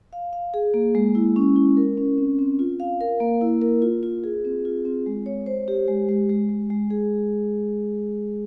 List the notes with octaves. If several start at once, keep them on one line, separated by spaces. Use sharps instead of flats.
F5
F5
G#4
A#3
G#3
E4
C#4
E4
A#4
C#4
C4
C4
F4
F5
A#4
A#3
E4
A#4
F4
F4
G#4
C4
F4
C4
G#3
C#5
C5
G4
G#3
G#3
G#3
G#3
G#3
G#4